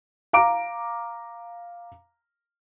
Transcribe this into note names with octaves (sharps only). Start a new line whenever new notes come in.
F5 A#5 D6 D7